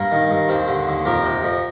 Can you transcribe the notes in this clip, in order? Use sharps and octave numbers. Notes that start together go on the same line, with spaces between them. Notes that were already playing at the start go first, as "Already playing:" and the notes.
Already playing: G2 A#3
D#3
G2
D#2 C4
D3
D#2
F2 G4 A#4
C3
F2